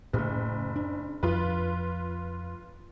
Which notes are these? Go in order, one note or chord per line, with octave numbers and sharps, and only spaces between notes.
F#1 A2 A3
D4
F2 F4 B4